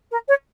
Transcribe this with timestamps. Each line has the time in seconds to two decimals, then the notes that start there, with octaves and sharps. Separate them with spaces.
0.11 A#4
0.28 C#5